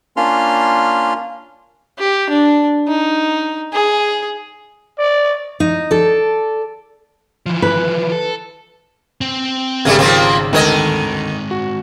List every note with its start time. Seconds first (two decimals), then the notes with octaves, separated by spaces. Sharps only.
0.17 A#3 C#4 D4 F4 C6 F6
1.98 G4
2.29 D4
2.88 D#4
3.73 G#4
4.98 D5
5.60 D#4
5.91 A4 D5
7.46 E3 F3
7.62 B4
8.12 A4
9.21 C4
9.85 G#1 C#3 G3 A3 A#3 G#6
9.99 F3 A#3 C4 A#4 F5
10.53 D2 D#3 G#3 C4 A4 A#4 D#5 G#6
11.51 F#4